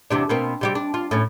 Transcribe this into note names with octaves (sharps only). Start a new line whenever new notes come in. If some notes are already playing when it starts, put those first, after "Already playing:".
E2 C3 D4
B2 A#3 C4
C3 G3 G4
D4
F4
A2 C#4